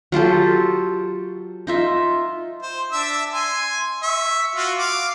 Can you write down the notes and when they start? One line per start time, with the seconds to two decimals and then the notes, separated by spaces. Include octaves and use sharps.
0.12 F#3 F4 G4 A4
1.67 D#4 F4 E5
2.62 C5
2.92 D4 E5 E6
3.33 G#5 C6
4.03 E5 C#6
4.56 F4 F#4
4.79 F5 D6